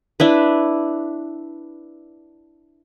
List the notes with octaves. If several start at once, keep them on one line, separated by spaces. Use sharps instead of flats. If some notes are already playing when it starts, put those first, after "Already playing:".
D4 E4 B4